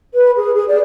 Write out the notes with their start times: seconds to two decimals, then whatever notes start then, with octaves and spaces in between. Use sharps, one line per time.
0.14 B4
0.37 G#4
0.55 G#4
0.68 D5